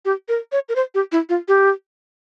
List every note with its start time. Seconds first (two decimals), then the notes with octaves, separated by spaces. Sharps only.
0.05 G4
0.29 A#4
0.52 C#5
0.69 A#4
0.76 C5
0.95 G4
1.12 E4
1.29 F4
1.48 G4